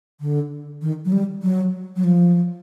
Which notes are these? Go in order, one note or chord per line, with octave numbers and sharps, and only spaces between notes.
D3
D#3
F#3
G3
F#3
F#3
F3